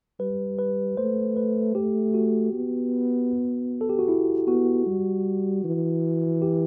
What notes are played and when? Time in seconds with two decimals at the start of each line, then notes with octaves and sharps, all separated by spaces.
0.20 G3 B4
0.59 B4
0.97 A3 C5
1.37 B4
1.75 A3 G4
2.14 F#4
2.53 B3
3.81 A4
3.89 G4
3.99 F#4
4.08 E4
4.47 B3 F#4
4.86 G3
5.64 E3
6.42 G4